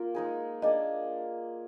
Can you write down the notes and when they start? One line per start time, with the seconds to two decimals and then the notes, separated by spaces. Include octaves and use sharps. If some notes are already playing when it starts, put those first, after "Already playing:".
Already playing: A#3 F4 A#4
0.15 G#3 D#4 G#4
0.62 A#3 D4 G#4 D#5